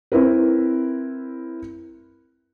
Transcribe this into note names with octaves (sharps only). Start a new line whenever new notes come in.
C4 E4 A#4 B4